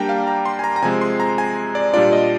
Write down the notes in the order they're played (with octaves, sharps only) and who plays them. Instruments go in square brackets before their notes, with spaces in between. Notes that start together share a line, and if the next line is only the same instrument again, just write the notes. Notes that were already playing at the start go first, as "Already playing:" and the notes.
Already playing: [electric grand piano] G3 A#3 D4 G5 A#5
F5
A#5
C6
G#5
A#5
A#5
C3 F3 G#3 C4 G#5
C6
A#5
G#5
D5
A#2 G3 D4 F4 D5
D#5